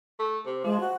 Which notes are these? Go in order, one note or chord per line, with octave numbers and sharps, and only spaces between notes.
A3
C3
F3 G#3
F#4